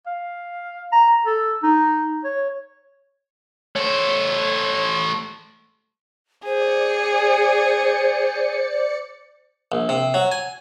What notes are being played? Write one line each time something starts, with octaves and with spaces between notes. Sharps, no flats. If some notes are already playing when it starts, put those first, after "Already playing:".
F5
A#5
A4
D#4
C#5
A3 C5 C#5
G#4 C5 D5 C#7
A#1
C3
F#3
G#5